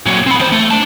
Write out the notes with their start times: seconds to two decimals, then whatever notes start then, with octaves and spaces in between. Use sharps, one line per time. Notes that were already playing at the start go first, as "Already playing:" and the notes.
0.06 A#2 F#3
0.27 C4 B5
0.40 D#3 C5
0.52 A3
0.71 D4 A5